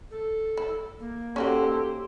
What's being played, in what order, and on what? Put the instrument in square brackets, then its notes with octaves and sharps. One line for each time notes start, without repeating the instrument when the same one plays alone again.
[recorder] A4
[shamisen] E4
[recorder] A#3
[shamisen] C#4 D#4 F#4 [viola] G4 C5 [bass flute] A4